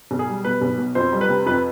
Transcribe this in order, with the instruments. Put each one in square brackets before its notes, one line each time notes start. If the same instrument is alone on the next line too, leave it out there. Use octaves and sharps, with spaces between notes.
[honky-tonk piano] B1
[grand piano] G#4
[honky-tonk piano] G3
[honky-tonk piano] B2 [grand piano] B4
[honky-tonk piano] B1
B2
[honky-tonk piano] F2 [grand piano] C5
[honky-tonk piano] G3
[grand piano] B4
[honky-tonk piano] C3
[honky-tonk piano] F2 [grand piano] B4